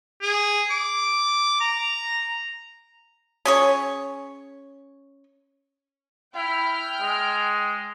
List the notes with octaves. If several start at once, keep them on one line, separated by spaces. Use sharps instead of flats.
G#4
D6
A#5
C#4 G#4 C#5
E4 G5 F6
G#3